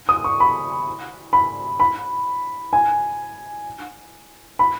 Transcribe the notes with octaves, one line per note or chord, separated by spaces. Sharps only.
D#6
C#6
B5
B5
B5
G#5
B5